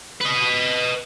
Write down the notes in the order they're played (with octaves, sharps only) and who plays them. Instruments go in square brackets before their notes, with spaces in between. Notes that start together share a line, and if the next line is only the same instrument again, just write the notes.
[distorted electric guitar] B4 D#5